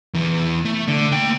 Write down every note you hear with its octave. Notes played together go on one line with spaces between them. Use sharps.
E2 E3
A3
D3
A#3 G5